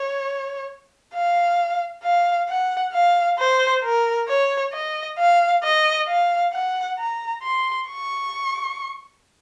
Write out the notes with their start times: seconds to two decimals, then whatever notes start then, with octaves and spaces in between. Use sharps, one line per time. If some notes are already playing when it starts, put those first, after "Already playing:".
Already playing: C#5
1.14 F5
2.04 F5
2.48 F#5
2.93 F5
3.38 C5
3.84 A#4
4.28 C#5
4.73 D#5
5.19 F5
5.64 D#5
6.08 F5
6.53 F#5
6.99 A#5
7.43 C6
7.89 C#6